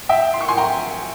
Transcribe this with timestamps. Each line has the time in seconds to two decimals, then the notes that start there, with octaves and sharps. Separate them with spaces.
0.09 E5 G5
0.34 C6
0.41 C#6
0.48 G#5 C6
0.57 G5 A#5